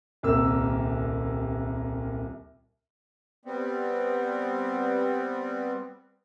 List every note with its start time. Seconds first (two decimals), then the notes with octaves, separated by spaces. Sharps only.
0.23 D#1 C2 A#3 A#4 E6
3.45 G3 B3 C4